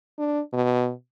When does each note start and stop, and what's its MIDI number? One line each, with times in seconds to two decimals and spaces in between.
0.19 0.41 62
0.53 0.91 47